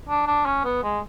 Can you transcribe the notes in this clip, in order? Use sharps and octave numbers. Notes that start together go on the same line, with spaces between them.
D4
D4
C#4
B3
G#3